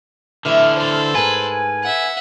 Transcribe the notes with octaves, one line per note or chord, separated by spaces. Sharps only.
D3 E3 A3 E4 F6
A4 C5
G#2 A#4 B4 G#5
E5 F#5